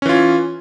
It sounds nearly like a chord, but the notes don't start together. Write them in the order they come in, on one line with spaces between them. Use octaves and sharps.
C#4 E3 F4